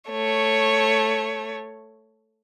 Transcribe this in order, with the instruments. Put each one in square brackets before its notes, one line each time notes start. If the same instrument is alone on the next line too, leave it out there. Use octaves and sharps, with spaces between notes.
[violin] A3 C#5